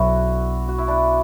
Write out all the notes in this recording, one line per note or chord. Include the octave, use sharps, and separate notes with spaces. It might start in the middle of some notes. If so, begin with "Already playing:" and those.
Already playing: B1 B2 F#3 D4 E4 F#4
F#4
E4
D4